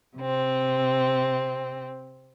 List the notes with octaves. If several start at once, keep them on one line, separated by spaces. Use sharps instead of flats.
C3 C4